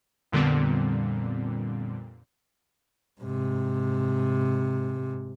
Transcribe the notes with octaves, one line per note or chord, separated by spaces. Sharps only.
F2 A#2 D3 G3 B3 C4
G#2 C3